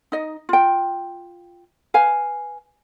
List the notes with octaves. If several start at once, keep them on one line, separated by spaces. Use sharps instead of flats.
D#4 D#5
F4 G5
B4 F5 G#5